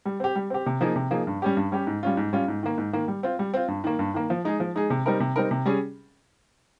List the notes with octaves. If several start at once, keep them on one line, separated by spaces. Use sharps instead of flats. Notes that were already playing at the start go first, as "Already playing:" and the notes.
G3
C4 G4
G3
C4 G4
C3
F3 A#3 D#4 G#4
C3
F3 A#3 D#4 G#4
G2
G3 C#4 G4
G2
G3 C#4 G4
G#2
G3 C#4 F4
G#2
G3 C#4 F4
G#2
D#3 A#3
G#2
D#3 A#3
G3
C4 F4
G3
C4 F4
G2
D#3 A#3
G2
D#3 A#3
F3
G#3 D#4 G#4
F3
G#3 D#4 G#4
C3
G3 C4 D#4 A#4
C3
G3 C4 D#4 A#4
C3
G3 C#4 G#4